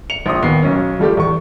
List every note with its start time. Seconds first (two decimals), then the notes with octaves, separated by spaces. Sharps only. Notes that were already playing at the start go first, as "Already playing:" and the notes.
0.10 C#7 F7
0.26 A#1 C6 D#6
0.42 D#2 B3 C7
0.62 B1 C#4
0.99 F3 G3 A3 G4
1.17 E2 C#6